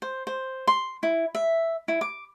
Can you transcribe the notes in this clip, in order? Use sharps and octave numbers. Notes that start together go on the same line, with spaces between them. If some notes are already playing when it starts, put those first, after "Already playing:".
C5
C5
C6
E4
E5
E4
D6